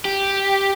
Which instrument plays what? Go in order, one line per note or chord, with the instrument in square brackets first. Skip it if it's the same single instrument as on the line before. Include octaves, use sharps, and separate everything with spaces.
[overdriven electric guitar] G4